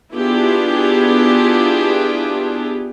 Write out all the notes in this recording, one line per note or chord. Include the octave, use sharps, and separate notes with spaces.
B3 D4 E4 F4 G4 G#4